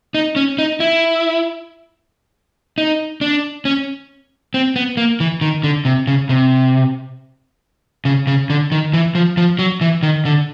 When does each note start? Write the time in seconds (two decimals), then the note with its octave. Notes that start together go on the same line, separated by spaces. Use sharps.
0.14 D#4
0.36 C#4
0.58 D#4
0.80 E4
2.78 D#4
3.21 D4
3.65 C#4
4.54 C4
4.76 B3
4.97 A#3
5.20 E3
5.41 D#3
5.64 D3
5.85 C3
6.07 C#3
6.29 C3
8.05 C#3
8.27 C#3
8.50 D3
8.72 D#3
8.93 E3
9.15 F3
9.37 F3
9.59 F#3
9.81 E3
10.03 D#3
10.25 D3